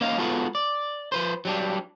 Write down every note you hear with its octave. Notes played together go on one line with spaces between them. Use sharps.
A#3 C#4 D#5 F5
G#3 B3 F4 F#4 A4 B4
D5
F3 B4 C5
F#3 G3 D4